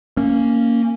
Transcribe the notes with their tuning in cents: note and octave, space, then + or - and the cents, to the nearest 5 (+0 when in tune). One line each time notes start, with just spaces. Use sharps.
A#3 -10 C#4 +0